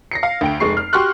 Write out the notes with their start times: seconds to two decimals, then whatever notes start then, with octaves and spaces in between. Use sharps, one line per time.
0.11 A#6 C7 C#7
0.23 F5
0.41 D2 G5 D7
0.60 F1 G#3 C#6 C7
0.77 F6
0.93 F#4 G4 C6 C#6 F6 F#6